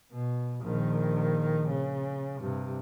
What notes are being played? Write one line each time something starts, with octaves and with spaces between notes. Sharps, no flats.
B2
A#1 D#3
C#3
G2 C3